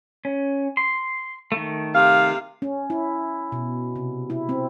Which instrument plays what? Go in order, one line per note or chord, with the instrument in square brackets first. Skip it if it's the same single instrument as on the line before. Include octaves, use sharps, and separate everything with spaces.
[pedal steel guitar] C#4
C6
D#3 A3
[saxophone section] C3 F5
[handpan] C#4
E4
B2
C3
E4
C4